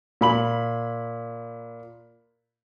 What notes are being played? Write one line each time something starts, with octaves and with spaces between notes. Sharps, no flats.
A#2 B5 F#7